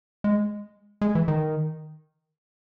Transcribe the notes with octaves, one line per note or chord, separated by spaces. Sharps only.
G#3
G#3
E3
D#3